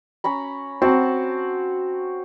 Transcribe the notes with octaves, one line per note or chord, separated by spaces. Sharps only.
C#4 A#5 B5
C4 F#4 F#5 A5